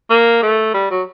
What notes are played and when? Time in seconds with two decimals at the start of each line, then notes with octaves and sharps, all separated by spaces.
0.10 A#3
0.42 A3
0.74 G3
0.91 F#3